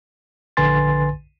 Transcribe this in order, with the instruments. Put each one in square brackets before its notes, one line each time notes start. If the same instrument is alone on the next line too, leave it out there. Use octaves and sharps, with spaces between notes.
[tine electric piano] A#1 D3 B4 G#5 C6 A6